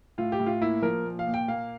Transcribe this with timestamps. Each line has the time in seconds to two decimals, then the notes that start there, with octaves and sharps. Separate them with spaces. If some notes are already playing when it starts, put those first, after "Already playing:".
0.18 A2 F4
0.32 G4
0.40 A2
0.46 F4
0.61 A#3 E4
0.82 F3 A#4
1.05 A#2
1.19 F5
1.27 A#2
1.34 G5
1.48 A#3 F5